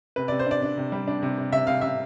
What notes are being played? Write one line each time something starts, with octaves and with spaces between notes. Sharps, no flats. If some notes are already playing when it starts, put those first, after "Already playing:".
C3 B4
C3 D5
C5
D4 D5
D4
C3
G3
D4
C3
C3
C3 E5
C3 F5
C3 E5